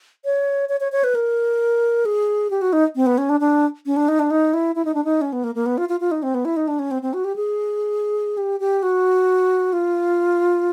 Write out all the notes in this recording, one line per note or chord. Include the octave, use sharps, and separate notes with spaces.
C#5
C#5
C#5
C#5
B4
A#4
G#4
G4
F#4
D#4
C4
B3
C#4
D4
D4
C#4
D4
D#4
D4
D#4
E4
E4
D#4
D4
D#4
C#4
B3
A#3
A#3
B3
F4
F4
F4
D#4
C4
B3
E4
D#4
D4
C#4
C4
C4
F#4
G4
G#4
G4
G4
F#4
F4